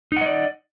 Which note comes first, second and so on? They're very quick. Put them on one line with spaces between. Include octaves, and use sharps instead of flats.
D#4 F#5 D#5 D5